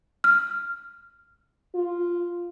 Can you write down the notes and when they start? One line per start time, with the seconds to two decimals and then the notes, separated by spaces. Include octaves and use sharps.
0.24 F6
1.75 F4